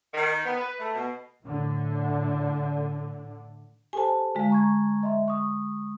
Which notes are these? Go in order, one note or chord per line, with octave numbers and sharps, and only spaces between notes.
D#3
B3
B4
A3
B2
A2 D3
G4 A4 C5 G#5 A5
D3 G#3 F#4 F5
A#5 C#6 G#6
D#5 E5 C6
C#6 D#6